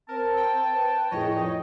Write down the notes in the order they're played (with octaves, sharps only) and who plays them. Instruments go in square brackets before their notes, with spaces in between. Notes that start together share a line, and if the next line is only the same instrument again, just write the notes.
[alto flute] C4 [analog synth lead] A#4 [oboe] A5
[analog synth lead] G5
[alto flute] B4
[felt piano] F2 A2 G#4 [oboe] C#5 [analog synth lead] D#5 [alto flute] G5
[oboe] D#4 [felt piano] C#5